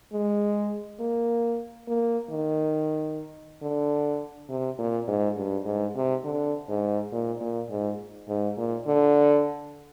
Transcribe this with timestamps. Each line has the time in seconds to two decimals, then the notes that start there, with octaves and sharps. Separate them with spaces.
0.13 G#3
1.00 A#3
1.87 A#3
2.31 D#3
3.62 D3
4.49 C3
4.79 A#2
5.08 G#2
5.37 G2
5.65 G#2
5.95 C3
6.24 D3
6.68 G#2
7.12 A#2
7.41 A#2
7.70 G#2
8.28 G#2
8.57 A#2
8.87 D3